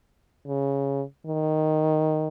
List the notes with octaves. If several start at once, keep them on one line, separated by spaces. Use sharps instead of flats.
C#3
D#3